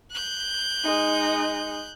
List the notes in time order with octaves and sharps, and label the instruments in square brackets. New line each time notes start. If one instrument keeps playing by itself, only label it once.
[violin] F#6 G6
[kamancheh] G#3 D#4